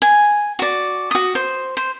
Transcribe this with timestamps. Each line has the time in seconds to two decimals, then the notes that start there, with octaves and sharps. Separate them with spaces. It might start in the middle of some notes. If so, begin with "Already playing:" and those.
0.02 G#5
0.59 F#4 D5
1.11 F#4 D#6
1.35 C5
1.77 C5